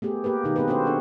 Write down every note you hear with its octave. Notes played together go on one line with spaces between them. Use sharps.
A3 B3 G4 G#4
A#3 G4 A#4 B4
B2 D#3 D#4 G4
B3 C4 G4 G#4 B4
C4 D4 F#4 A4 B4 C5
B3 D4 A4 A#4